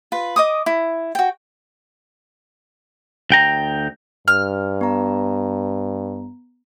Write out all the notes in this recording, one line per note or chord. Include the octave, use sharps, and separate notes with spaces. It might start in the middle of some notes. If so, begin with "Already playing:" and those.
F4 B4
D#5 D6 D#6
E4
F#4 G5
D2 G5 A#5
G2 F6
B3 A#5